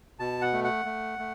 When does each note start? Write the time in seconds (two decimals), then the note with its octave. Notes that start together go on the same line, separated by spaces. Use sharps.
0.19 B2 A5
0.42 F#5
0.53 A3
0.64 F#5
0.86 A3
1.19 A3